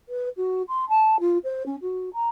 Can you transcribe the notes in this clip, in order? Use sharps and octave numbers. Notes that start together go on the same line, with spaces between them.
B4
F#4
C6
A5
F4
C5
C#4
F#4
A#5